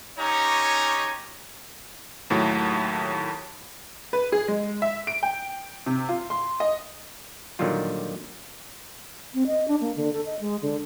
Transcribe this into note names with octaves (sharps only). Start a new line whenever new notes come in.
C#4 D#4 G4 C#5 G#5 A#5
D#2 A2 F#3
B4
G#4
G#3
E5
D7
G5
C3
F4
C6
D#5
A#2 D3 D#3 F#3 G3 F4
C4
D#5
D4
A#3
D3
A4
D#5
G#3
D3